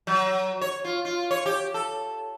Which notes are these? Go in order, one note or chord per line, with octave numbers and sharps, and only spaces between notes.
F#3
C#5
F4
F4
C#5
G4
A4